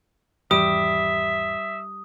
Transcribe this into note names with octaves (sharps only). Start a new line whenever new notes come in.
G#1 E2 E3 G3 E5 D#6